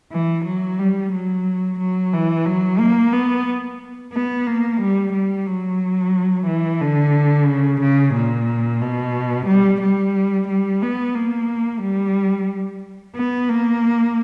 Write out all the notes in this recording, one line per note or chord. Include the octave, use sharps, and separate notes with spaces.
E3
F#3
G3
F#3
F#3
E3
F#3
A#3
B3
B3
A#3
G3
G3
F#3
E3
D3
C#3
C#3
A#2
B2
G3
G3
G3
B3
A#3
G3
B3
A#3